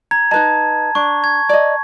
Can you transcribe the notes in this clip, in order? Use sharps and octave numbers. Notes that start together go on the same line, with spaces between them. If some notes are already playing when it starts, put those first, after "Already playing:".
A#5 G#6
D#4 B4 D#5 A5
D4 C#6
G#6
D5 D#5